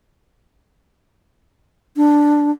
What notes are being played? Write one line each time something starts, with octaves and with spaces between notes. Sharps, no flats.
D4